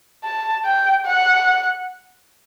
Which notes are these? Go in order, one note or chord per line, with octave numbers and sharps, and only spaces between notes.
A5
G5
F#5